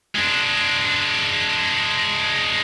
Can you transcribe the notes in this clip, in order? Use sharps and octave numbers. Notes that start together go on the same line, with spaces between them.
G#3 D4